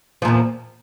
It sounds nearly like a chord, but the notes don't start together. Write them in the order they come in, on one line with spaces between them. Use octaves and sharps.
F3 A#2 E2